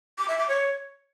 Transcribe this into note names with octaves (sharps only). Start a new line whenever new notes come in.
D6
E5
D6
C#5